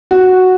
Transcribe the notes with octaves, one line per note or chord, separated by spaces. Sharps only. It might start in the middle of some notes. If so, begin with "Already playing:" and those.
F#4